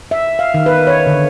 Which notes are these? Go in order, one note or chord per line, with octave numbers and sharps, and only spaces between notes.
E5
F5
D#3
B4
C#5
D3